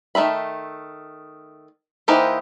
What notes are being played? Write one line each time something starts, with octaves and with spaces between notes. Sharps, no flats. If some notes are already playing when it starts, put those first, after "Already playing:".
D#3 A3 E5 B5
E3 A#3 D#4 G4 C5